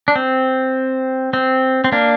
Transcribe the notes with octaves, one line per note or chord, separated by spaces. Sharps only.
D4
C4
C4
C4
A#3 D4